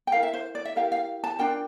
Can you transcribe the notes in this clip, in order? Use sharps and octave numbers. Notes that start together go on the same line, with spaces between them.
G5
E4 A#4 F5
E5
C5
D5
E5
E4 G4 A#4 F5
F5
A5
D4 F4 A#4 G5